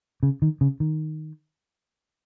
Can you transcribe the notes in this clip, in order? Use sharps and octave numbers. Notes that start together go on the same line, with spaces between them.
C#3
D#3
C#3
D#3